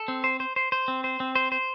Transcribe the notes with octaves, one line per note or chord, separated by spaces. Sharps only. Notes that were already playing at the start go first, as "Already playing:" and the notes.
Already playing: A4
C4
C5
C5
C5
C5
C4
C5
C4
C5
C5